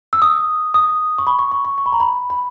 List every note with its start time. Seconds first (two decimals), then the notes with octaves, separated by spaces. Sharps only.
0.13 E6
0.22 D#6
0.74 D#6
1.18 C#6
1.27 B5
1.39 C#6
1.52 C#6
1.65 C#6
1.78 C#6
1.86 B5
1.93 A#5
2.00 B5
2.30 B5